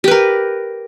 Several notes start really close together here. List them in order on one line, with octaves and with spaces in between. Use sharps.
G4 B4 A#4